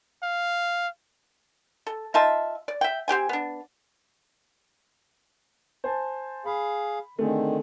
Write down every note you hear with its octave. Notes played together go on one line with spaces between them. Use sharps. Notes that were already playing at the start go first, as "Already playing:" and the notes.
F5
A4
D#4 F4 E5 A5
D5
E5 G5
C4 G4 G5 G#5
B3 D4
C5 G#5 A5
G#4 F5 B5
D3 D#3 A3 C4 G#4